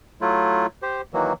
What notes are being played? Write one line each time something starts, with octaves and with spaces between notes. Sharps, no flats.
F#3 A3 E4 F4
G4 C5
D#3 E3 F#3 A#3